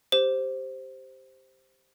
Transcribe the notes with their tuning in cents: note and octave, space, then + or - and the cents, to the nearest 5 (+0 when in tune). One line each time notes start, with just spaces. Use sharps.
G4 +0 C5 +0